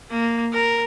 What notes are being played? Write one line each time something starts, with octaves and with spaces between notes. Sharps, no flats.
A#3
A#4